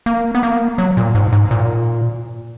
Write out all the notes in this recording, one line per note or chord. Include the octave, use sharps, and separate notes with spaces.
A#3
B3
A#3
F#3
A#2
G#2
G#2
A#2